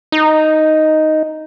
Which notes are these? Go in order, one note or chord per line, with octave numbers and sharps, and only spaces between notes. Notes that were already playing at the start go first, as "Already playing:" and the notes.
D#4